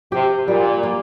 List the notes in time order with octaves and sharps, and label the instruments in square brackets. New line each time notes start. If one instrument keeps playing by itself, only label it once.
[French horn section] C3 [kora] G4
[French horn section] A#2 [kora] G3
[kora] A#3